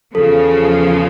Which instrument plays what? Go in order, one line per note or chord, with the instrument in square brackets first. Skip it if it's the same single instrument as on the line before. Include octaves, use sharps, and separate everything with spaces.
[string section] E2 C#3 F3 [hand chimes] A4